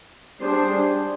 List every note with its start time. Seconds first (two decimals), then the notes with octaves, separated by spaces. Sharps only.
0.40 G3 D4 G#4 C5